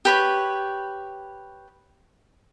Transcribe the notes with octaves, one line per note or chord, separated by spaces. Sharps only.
G4 B4 C#5